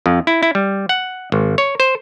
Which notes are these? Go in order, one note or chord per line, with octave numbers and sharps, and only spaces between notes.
F2
E4
E4
G3
F#5
G#1
C#5
C5